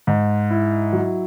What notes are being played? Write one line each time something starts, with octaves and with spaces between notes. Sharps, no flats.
G#2
E4
F#3